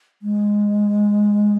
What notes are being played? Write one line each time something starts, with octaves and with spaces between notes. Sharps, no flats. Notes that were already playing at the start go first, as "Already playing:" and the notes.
G#3